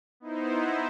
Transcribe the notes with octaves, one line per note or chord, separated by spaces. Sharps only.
B3 D#4 E4 C5